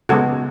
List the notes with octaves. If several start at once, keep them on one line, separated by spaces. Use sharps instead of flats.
C#3 G#3 B3 F#4 A4